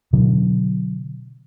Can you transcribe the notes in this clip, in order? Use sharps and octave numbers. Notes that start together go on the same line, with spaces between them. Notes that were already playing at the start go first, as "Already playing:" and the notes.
B2 D3 F#3